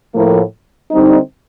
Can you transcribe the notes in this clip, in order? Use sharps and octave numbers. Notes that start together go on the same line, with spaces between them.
A2 F3 A#3
D3 G3 C4 D#4